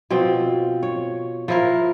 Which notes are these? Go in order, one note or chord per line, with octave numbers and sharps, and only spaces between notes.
B2 F3 C4
C#5
F3 E4 A#4